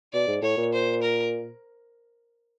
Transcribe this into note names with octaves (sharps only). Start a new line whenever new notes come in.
B2 D5
G#2
A2 C#5
A#2
C5
A#4